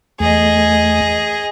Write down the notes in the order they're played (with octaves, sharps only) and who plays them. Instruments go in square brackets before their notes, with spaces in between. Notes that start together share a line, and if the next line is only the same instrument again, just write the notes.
[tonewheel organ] E2 A3 [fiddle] G#4 D#5